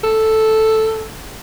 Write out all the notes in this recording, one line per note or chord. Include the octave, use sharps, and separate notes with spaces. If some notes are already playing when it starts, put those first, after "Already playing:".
A4